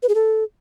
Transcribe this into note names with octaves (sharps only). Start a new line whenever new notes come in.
B4
G#4
A4